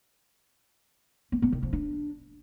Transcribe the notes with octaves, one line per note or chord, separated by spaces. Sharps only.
B3
B3
D#3
F3
D4